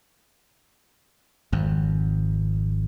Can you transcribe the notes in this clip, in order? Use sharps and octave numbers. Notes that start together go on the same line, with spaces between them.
G#1 F2